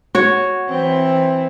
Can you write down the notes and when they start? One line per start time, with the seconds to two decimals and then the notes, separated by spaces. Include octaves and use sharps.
0.15 F#4 C#5
0.71 E3 C4